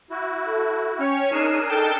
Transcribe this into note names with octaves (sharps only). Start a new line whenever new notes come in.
E4 F#4
A4
C#4 C#5 G5
D4 D#4 G#4 A#4 C7 D#7 E7
D#4 A4 G5 A5